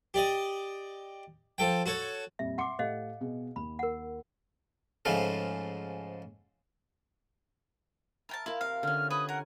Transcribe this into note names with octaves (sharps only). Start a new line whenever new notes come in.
G4 D5 D#5
F3 A4 G5
F#4 A4 C#5
F2 A#2 G3 E5
E5 F#5 C6 D6 C#7
A2 G4 A4 C5 D#5 F5
B2 G#4
D#2 B5
A#4 F#5
G#2 C#3 F3 A3 F4
E4 A#4 G5 A5
E4 F4 A#4 A5
C3 F5
D3 C#4 F6
B4 G#5 D#6
A#4 F#5